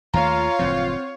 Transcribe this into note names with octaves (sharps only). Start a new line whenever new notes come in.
D#2 D#3 A3 F4 C#5 F5 A#5
F#1 A2 F3 C4 G6